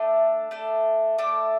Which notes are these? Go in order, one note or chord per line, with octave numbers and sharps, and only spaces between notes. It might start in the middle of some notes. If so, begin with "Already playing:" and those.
Already playing: A3 D4 A4
A3 D4 A4
A3 D4 A4 D6